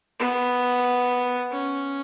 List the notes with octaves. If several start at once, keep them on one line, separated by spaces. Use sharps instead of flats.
B3
C#4